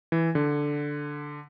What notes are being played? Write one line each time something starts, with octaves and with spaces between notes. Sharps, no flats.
E3
D3